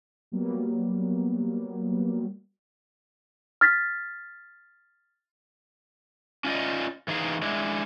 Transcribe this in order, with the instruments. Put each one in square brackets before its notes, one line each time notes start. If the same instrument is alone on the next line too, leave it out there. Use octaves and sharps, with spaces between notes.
[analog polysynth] F#3 G3 A#3 B3
[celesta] F6 A6 B6
[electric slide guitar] C#4 F4 D5 D#5
E3 D#4 G#4 F5
G#3 D4 E4